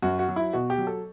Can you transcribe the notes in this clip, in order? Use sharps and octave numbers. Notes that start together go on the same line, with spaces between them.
F#2 F#4
F#4
F#3
E4
B2 F#4
G4
F#3
A4